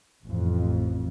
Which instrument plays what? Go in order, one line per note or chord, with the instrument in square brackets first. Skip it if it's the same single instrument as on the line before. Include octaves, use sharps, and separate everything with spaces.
[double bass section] A1 F2